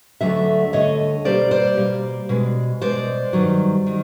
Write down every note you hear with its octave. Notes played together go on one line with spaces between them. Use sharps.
D2 D3 F#3 A3 D5 E5
D2 D3 F#3 A3 C#5 D#5
B2 G3 A#3 C5 D5
C5 D5
B2 G3 A#3
B2 G#3
B2 G#3 C5 D5
G2 D#3 F#3
D#3 F#3